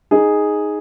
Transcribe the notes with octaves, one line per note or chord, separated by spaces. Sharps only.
D#4 G#4